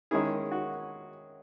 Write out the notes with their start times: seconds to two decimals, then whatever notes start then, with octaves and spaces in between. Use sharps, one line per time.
0.11 D#3 G#3 C#4 E4 G#4
0.52 F#4